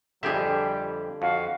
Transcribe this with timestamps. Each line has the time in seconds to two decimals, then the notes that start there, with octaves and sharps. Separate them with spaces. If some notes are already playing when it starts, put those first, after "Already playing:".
0.23 F2 D3 G3 G4 G#4 E5
1.22 F2 F#4 F5